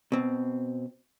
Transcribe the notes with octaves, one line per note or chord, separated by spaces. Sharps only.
B2 C4